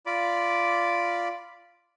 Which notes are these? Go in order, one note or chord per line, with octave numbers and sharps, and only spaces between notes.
F4 D5 B5 D6